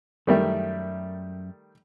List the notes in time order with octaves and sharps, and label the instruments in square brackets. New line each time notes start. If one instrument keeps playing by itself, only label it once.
[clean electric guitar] F#2 E5 [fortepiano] D#3 G3 A3